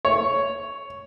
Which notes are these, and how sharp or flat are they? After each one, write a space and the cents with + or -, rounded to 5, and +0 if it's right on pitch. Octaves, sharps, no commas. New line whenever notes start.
C#5 +5